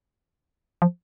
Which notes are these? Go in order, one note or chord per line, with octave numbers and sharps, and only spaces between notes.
F3